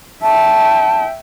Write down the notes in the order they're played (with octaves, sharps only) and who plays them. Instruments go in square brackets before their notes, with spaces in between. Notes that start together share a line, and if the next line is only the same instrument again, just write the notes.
[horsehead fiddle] E5 G5 [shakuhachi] A5